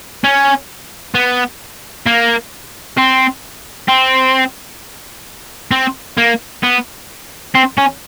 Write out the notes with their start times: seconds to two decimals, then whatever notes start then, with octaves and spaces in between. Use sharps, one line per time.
0.24 C#4
1.15 B3
2.07 A#3
2.98 C4
3.89 C4
5.71 C4
6.18 A#3
6.64 B3
7.55 C4
7.78 C#4